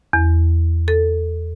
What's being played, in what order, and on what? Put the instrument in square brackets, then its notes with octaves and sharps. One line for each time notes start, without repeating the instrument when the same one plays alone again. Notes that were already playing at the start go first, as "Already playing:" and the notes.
[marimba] E2
A4